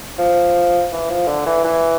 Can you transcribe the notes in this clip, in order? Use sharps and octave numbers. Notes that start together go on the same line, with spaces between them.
F3
E3
F3
D3
E3
E3